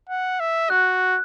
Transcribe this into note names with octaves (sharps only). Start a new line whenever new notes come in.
F#5
E5
F#4 F#6